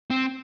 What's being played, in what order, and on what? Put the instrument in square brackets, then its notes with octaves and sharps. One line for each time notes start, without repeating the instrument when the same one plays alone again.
[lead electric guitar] C4